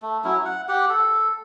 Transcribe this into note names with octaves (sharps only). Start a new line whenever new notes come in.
A3
F#3 C#4 E4
F#5
G4 F#5
A4